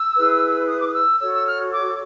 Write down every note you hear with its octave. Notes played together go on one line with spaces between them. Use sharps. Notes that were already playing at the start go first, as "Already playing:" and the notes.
Already playing: E6
E4 G#4 B4
D#6
D6
D#6
E6
F#4 A4 C#5 E6
E6
F6
D6